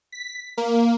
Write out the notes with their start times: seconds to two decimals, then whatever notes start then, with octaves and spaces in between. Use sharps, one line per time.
0.12 B6
0.58 A#3